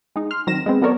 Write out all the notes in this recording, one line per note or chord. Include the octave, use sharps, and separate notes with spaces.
G#3 D#4
C6 F6
D#3 F#3 C4 A#6 E7
G#3 B3 C4
F#3 B3 A4 A#4 C#5 D5